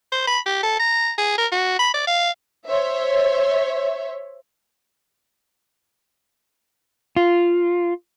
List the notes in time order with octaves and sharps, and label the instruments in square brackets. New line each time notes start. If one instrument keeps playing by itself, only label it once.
[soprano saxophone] C5
B5
G4
A4
A#5
G#4
A#4
F#4
B5
D5
F5
[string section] C5 C#5 E5
[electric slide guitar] F4